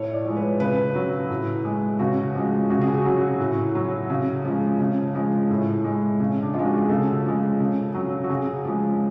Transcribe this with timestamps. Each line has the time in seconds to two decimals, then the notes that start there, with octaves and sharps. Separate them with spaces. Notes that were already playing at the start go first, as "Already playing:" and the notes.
Already playing: A2 C#5
0.13 D5
0.25 F3 G#3
0.36 B4
0.60 C#3 B4
0.95 F#3
1.30 A2
1.65 G#3
1.99 C#3 F#4
2.35 F3 G#3
2.70 C#3 F#4
2.81 G#4
2.94 F#4
3.05 F#3
3.40 A2
3.75 F#3
4.10 C#3
4.45 F3 G#3
4.80 C#3
5.15 F3 G#3
5.50 A2
5.84 G#3
6.20 C#3
6.42 D4
6.54 F3 G#3 F4
6.65 F#4
6.78 G#4
6.89 C#3 A4
7.25 F3 G#3
7.60 C#3
7.94 F#3
8.24 F#4
8.29 C#3 G#4
8.65 F3 G#3